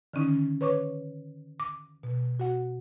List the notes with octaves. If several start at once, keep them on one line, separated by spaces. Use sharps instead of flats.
D3 D#3 C#4 D#4
B4 C#5 C#6 D6
D6
B2
F#4 F#5